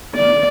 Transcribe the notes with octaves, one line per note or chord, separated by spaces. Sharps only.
D5